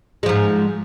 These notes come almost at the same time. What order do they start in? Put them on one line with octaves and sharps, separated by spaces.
G#3 F3 G#2